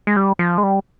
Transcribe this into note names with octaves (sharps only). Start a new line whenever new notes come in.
G#3
G3
F3
G#3
G3